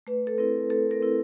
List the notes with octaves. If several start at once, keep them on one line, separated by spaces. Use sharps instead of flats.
A3 B4
A4
C4 E4 A#4
A3 A4
A#4
C4 E4